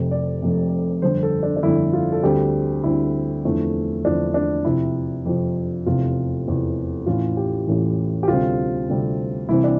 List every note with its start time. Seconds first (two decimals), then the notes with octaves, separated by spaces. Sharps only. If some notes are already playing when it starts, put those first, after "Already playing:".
Already playing: F1 F2 C3 C5
0.11 D5
0.42 F1 F2 C3
1.02 G1 F2 D3 C5
1.23 A4
1.43 D4
1.57 D4
1.63 G1 F2 D3 E4
1.93 F4
2.12 A4
2.23 D2 D3 G3 C4 G4
2.84 D2 D3 G3 C4 E4
3.44 E2 D3 F3 A3 C4
4.05 E2 D3 F3 A3 C4 D4
4.34 D4
4.65 F2 C3 F3 E4
5.25 F2 C3 F3
5.86 F1 E2 C3 F4
6.47 F1 E2 C3
7.06 A1 A2 E3 F4
7.37 G4
7.67 A1 A2 E3
8.23 G4
8.28 D2 C3 G3 C4 F4
8.88 D2 C3 G3 C4
9.49 C2 C3 E3 G3 C4 E4
9.64 D4